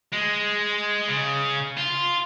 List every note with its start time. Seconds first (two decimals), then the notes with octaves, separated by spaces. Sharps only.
0.13 G#3
1.08 C#3
1.78 F4